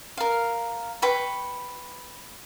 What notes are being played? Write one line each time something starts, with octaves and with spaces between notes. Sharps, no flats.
A#4 F5
B4 G5 B5 C#6